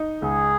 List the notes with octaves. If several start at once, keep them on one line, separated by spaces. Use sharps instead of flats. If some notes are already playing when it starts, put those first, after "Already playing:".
Already playing: D#4
C#2 G#4